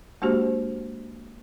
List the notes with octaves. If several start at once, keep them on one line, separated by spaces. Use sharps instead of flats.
G#3 A#3 D4 F#4 G4 C5